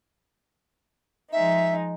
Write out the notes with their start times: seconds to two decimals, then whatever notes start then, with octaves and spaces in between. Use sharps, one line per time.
1.32 F3 G#3 D#4 E5